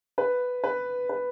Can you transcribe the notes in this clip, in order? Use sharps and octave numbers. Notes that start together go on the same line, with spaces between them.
B4
B4
B4